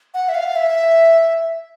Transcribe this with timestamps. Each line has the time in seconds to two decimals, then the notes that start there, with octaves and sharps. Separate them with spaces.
0.14 F#5
0.29 E5
0.34 F5
0.56 E5